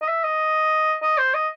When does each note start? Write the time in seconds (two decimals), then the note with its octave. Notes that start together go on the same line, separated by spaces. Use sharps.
0.02 D#5
0.08 E5
0.24 D#5
1.03 D#5
1.18 C5
1.34 D#5